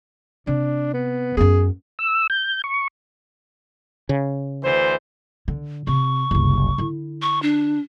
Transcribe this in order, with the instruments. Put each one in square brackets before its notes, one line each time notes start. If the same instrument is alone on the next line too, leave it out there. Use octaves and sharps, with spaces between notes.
[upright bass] C3 [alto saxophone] D4
[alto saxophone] B3
[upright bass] F#2 B3 [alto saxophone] G#4
[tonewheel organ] E6
G6
C#6
[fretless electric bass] C#3
[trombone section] D2 E3 C5
[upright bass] D3
[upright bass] C3 [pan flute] C#6
[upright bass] F#1 C2
D3 E4
[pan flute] C#6
D4